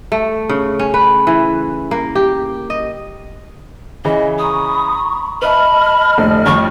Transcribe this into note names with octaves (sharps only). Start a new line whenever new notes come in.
A3
C#3
C#4
B4
E3
A#3
G4
D#5
C#3 E3 D#5
A#5 B5 C#6 D#6
B4 D#5 E5 A5 B5 F6
F1 A2 D3
A1 F2 C#6